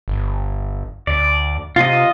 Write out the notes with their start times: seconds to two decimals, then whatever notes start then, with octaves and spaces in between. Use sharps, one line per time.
0.08 G1
1.07 D2 D5
1.76 C3 F4 D#5